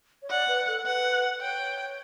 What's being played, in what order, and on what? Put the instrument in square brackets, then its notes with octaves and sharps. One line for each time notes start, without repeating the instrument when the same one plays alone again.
[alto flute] C#5
[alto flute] D5 [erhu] F#5
[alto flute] B4
A4
[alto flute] B4 [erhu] F#5
[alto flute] C#5 [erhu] G5